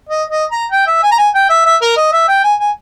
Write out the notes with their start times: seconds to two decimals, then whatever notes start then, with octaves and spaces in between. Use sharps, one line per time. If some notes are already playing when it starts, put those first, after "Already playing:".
0.09 D#5
0.30 D#5
0.51 A#5
0.72 G5
0.87 E5
1.03 G#5
1.11 A#5
1.18 G#5
1.35 G5
1.50 E5
1.65 E5
1.82 A#4
1.97 D#5
2.12 E5
2.28 G5
2.44 G#5
2.60 G#5